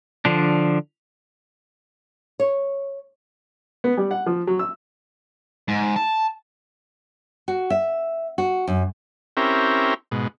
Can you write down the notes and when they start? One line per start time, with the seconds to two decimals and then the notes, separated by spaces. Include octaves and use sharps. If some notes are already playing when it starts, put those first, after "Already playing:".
0.25 D3 F3 D4
2.40 C#5
3.84 B3
3.97 G3
4.11 F#5
4.26 F3
4.47 F#3
4.59 E6
5.68 G#2
5.96 A5
7.48 F#4
7.70 E5
8.38 F#4
8.68 F#2
9.37 C4 C#4 E4 G4 A#4
10.11 G#2 B2